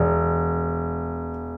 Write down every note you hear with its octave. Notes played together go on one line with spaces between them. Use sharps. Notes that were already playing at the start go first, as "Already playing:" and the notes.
Already playing: E1